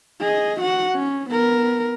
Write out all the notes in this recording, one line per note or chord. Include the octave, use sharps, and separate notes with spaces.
G#4 D#5
F#4 F#5
C#4
B3 A#4